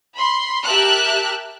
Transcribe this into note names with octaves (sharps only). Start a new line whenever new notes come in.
B5 C6
G4 A#4 E5 A5 F6 F#6